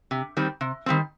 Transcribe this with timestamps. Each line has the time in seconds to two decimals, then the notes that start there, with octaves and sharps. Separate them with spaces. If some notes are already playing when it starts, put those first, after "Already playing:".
0.11 C3
0.37 D#3 G3 C4
0.61 C3
0.86 D#3 G3 C4